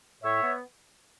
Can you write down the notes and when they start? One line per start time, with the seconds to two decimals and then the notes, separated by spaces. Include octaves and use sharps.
0.22 A2 C#5 E5
0.41 B3